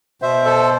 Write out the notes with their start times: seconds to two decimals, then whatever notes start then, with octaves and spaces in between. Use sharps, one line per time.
0.22 B2 C5 E5
0.45 A4 C5